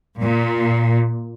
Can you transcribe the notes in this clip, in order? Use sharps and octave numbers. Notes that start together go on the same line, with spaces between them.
A#2